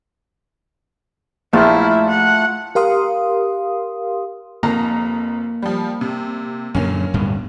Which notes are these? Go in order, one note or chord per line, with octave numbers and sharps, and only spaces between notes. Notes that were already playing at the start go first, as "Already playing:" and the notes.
A#1 A3 E4 F4
F#5
G4 A#4 F5 C6 D#6
F1 F2 A#3 A#5
F3 G3
C3
F#2 A#2 D3 A#3 C#4
D1 G2 B2